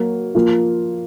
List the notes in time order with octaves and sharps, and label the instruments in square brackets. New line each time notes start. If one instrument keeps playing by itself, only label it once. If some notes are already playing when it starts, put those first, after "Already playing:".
Already playing: [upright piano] F#3 A#3
F3 A#3 F4